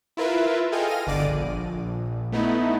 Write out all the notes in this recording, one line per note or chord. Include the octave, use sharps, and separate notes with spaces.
E4 F4 A#4 B4 E5
G#4 A4 D#5 F5 G5 G#5
F6 A#6 D#7
G1 D3 D5 D6 D#7
A#1
A3 B3 D#4 E4